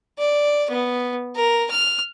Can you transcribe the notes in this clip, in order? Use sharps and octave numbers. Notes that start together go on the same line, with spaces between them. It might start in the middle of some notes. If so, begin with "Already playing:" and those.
D5
B3
A#4
F6